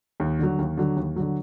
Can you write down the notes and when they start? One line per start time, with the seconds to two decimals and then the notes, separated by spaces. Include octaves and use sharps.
0.20 D#2
0.39 D3 F#3
0.59 D#2
0.77 D3 F#3
0.97 D#2
1.16 D3 F#3